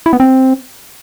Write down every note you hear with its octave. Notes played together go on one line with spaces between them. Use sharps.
E4
B3
C4